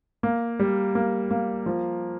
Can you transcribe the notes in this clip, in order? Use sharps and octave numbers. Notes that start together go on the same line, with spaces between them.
A#3
G3
A#3
A#3
F3